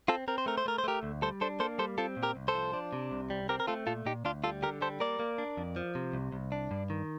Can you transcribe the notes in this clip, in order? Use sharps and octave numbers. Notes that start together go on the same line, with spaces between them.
C4 F4 A4
C4 A#4
C5
A3 A#4
C5
A3 A#4
C5
A3 G4 A#4
D2
G3 A4 C5
D4 A4 C5
A#3 A4 C5
G3 A4 C5
C4 F4 A4
A#2
G4 A#4
C2
A4 C5
F3
D4
C3
C2
G3
C4 G4 A#4
A#4
A3 F4 A4
A#2 F4 A4
A#2 D#4 G4
D2 D4 F4
G3 F4 A4
D3 G4 A#4
G3 A4 C5
A#3 A#4 D5
A#3
D4
F2
F3
C3
C2
C2
D4
G2
D#3